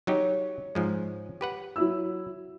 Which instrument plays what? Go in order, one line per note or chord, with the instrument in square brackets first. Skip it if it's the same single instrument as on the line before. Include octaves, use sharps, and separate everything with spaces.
[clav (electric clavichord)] F#3 D#4 G4 [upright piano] C#5
[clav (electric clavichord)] G#2 F3 G#3
G4 B4 F#5
[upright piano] F#3 E4 E6